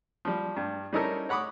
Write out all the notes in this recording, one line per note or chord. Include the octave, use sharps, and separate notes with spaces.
F3 G3
G2
G3 C#4 D#4 E4 A4 A#4
C#5 F#5 B5 D6 D#6